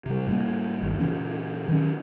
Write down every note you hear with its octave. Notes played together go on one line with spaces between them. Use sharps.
C3 G3
A2 G3 A#3
G1 D#2
A#2 C#3 E3 C#4
D#3 F#3 B3 C#4